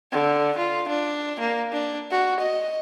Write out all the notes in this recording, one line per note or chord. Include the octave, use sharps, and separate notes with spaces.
D3
F4
D4
A#3
D4
F#4
D#5